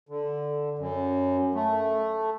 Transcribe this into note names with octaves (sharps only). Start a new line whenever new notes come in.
D3
F#2
A3